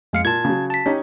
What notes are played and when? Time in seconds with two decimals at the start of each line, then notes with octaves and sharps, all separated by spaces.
0.13 F2 G#3 F5 C#7
0.25 A#2 A5 G#6
0.45 C#3 F#3
0.70 A5 B6
0.86 C#4 D#4 G4